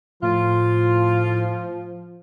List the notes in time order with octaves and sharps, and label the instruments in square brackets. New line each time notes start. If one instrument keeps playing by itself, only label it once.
[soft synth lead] A2 [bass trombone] F3 [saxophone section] F4